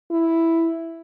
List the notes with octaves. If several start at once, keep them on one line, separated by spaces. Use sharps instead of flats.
E4